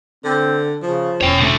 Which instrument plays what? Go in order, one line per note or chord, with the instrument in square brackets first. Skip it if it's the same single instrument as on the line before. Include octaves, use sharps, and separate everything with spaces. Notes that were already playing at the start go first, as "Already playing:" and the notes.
[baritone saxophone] D3 [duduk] C4
[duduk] C#3 [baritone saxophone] F3
[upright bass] E1 [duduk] C#4 [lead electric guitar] C#5 G5
[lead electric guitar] D3 A3